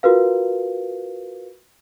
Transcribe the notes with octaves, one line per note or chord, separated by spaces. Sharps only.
F4 F#4 A#4 B4 F5